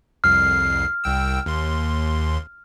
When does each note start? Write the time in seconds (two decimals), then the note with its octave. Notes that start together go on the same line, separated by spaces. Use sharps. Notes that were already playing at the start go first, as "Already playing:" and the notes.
0.24 C2 F2 F6 C7
1.04 C2 G5 E6
1.46 D#2 C6